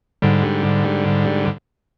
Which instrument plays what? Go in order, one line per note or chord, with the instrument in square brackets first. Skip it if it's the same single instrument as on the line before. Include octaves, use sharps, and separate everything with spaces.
[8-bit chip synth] G#2 D3 G3